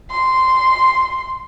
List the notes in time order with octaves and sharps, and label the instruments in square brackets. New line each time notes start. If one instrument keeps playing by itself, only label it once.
[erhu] C6